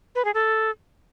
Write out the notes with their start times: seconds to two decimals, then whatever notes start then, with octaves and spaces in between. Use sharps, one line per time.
0.15 B4
0.25 G#4
0.34 A4